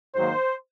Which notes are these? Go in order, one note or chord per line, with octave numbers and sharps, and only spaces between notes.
G#2 D#3 F#3 A#3 C5